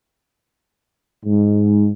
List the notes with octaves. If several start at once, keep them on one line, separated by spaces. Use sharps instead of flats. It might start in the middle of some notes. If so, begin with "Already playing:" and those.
G#2